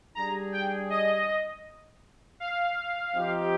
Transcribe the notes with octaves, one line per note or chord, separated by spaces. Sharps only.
G3 D4 G#4 A#5
G5
D#5
F5
F3 C4 D#4 G4